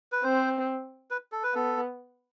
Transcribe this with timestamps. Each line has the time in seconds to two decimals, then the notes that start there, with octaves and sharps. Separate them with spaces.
0.12 B4
0.23 C4 C5
1.11 B4
1.32 A4
1.43 B4
1.54 B3 A4